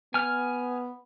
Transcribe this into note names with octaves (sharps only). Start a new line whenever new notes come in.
B3 G#5 F6